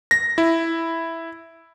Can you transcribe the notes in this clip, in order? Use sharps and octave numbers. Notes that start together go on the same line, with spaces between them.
A#6
E4